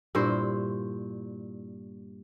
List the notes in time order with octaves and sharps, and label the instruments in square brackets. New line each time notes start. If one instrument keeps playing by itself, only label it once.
[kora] G2 A#2 E4 C5